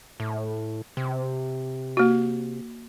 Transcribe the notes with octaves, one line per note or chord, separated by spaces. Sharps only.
A2
C3
A#3 F#4